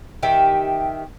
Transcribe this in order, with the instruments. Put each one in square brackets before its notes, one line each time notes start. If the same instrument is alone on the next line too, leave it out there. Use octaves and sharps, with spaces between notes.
[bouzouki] D#3 G4 E5